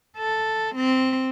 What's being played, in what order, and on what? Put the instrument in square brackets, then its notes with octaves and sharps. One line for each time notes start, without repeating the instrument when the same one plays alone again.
[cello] A4
C4